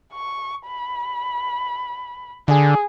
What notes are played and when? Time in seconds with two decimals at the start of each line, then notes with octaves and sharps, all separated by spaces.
0.13 C#6
0.66 B5
2.48 D3 G#4